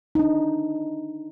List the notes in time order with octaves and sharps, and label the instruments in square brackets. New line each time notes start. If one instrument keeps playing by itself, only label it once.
[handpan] D4 D#4